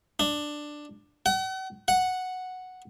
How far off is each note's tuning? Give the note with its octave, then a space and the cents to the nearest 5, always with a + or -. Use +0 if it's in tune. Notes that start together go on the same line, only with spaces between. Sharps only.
D4 +10
F#5 +40
F#5 -5